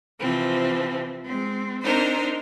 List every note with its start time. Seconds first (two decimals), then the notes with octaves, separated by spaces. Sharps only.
0.20 C3 E3 F3 C4
1.25 G#3 C4
1.83 C4 D4 D#4 A#4 C5